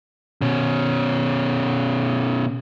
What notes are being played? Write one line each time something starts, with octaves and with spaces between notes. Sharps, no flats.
B2 C#4